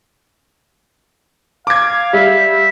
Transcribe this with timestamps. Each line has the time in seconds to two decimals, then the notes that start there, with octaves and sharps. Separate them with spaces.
1.67 F5 D6 G#6
2.13 G3 E5